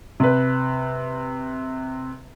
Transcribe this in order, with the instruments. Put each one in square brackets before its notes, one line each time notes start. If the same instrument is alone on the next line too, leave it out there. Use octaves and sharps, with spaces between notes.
[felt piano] C3 B4